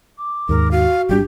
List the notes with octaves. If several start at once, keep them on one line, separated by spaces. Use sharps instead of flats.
D6
D#2 G#2 A#4
F#4 F5
G#1 G3 D4 G4